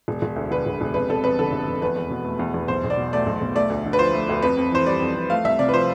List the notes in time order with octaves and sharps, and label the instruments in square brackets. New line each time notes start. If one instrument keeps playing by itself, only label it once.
[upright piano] E1
E1
D2
D3 B4
E1
E1
F1 B4
F1 A4
F2 B4
D3 A4
F1
F1
E2 B4
E2
B2
A3
E2
E2
B1 C5
B1
D5
B2
A3 D5
B1
B1
A3 D5
D2
D3
B4
F3 C5
A3
D2
F2 B4
F2
E3 C5
G3 D5
F2
F2
A3 F5
C2 E5
C3 D5
B4
F3 C5